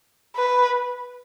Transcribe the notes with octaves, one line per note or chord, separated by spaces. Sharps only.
B4